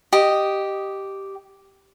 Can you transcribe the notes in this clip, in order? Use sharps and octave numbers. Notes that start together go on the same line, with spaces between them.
G4 D#5